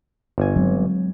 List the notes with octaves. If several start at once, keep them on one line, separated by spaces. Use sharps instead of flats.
G1 G#5
F#3 G#3 C4